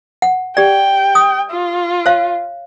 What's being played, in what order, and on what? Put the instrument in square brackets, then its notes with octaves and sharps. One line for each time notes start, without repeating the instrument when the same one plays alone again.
[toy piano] F#5
[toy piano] G4 D5 [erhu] G5
[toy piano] D#6
[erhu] F4
[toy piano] C#5 F5